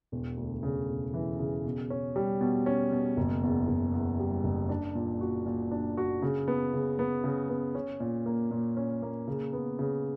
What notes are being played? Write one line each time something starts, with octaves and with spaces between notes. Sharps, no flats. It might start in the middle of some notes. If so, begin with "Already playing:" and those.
E1
D2
C#3
E1
E3
C#3
B2
C#4
G3
B2
C#4
B2
F#1
E2
F#1
E2
G3
F#1
D4
A#2
F#4
A#2
D4
F#4
C#3
B3
C#3
B3
C#3
B3
C#4
A#2
A#3
A#2
C#4
A#3
C#3
B3
C#3